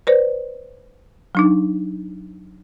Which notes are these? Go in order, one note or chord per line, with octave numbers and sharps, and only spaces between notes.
B4 C5 D5
F#3 D4 D#4